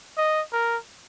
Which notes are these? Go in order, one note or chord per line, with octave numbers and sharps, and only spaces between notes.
D#5
A#4